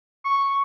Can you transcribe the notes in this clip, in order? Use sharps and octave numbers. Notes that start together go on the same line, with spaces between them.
C#6